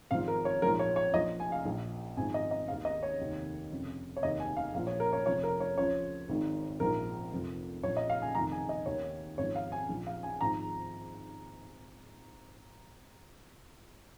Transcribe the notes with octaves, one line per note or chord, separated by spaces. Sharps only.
G#1 G#2 F3 F5
A#4
C#5
A#1 G#2 F3 A#4
C#5
C#5
A#1 A#2 F3 D#5
G#5
F5
A#1 A#2 F3
G#1 G#2 F3 G#5
D#5
D#5
D#2 D#3 F5
D#5
C#5
F1 D#2 D#3
F1 F2 C#3
C#5
F1 D#2 D#3 D#5
G#5
F5
A#1 A#2 F3 F5
C#5
A#4
C#5
F1 F2 F3 C#5
A#4
C#5
C#2 C#3 F3 C#5
G#1 G#2 D#3
A#1 G#2 F3 A#4
F1 F2 F3
A#1 A#2 F3 C#5
D#5
F5
G#5
F1 F2 D#3 A#5
G#5
D#5
D#2 D#3 C#5
G#1 G#2 F3 C#5
F5
G#5
A#1 A#2 F3
F5
G#5
G#1 G#2 F3 A#5